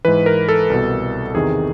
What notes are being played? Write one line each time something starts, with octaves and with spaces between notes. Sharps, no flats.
G#2 E3 B4
A#4
A4
C2 B2
E2 C3 D#3 G#4